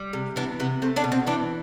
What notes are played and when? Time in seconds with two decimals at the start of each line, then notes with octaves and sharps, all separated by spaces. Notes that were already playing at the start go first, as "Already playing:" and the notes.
Already playing: G3
0.13 C3
0.36 E3 B3 D4
0.60 C3 B3
0.82 A3 C4
0.96 B3 D4
1.04 B2
1.12 C4
1.27 E3 B3 D4